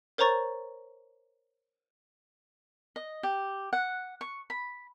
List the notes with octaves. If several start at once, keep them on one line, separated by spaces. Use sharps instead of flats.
A#4 C5 C#5 A#5 C#6 A6
D#5
G4
F#5
C#6
B5